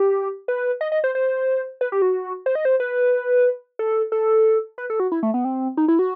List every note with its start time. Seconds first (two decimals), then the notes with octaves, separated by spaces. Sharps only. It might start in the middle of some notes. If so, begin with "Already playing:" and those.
Already playing: G4
0.48 B4
0.81 D#5
0.92 D#5
1.04 C5
1.15 C5
1.81 B4
1.92 G4
2.02 F#4
2.46 C5
2.55 D#5
2.65 C5
2.80 B4
3.79 A4
4.12 A4
4.78 B4
4.90 A4
5.00 F#4
5.12 E4
5.23 A3
5.34 B3
5.45 C4
5.77 D#4
5.88 E4
5.99 F#4